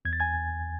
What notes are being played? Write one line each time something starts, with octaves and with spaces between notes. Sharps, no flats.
E2 G#6
A6
G#5 G#6